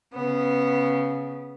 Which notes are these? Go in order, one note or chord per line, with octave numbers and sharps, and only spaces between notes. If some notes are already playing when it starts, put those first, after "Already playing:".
C#3 B3